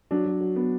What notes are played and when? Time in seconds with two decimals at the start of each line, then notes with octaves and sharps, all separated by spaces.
0.11 F#3 D4
0.25 F#3
0.41 F#3
0.56 B3